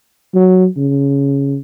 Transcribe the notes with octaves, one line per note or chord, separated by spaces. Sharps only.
F#3
C#3